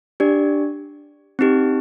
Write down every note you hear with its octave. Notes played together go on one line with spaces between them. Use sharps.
D4 G4 D5
C4 D#4 G4